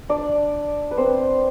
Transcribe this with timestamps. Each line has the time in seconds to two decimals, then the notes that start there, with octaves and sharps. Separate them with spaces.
0.09 D4 D5
0.91 B4
0.98 C4 C5